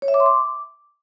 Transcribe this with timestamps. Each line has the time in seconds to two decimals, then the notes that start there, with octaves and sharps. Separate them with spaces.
0.02 C#5
0.08 E5
0.14 D6
0.20 C6
0.26 D6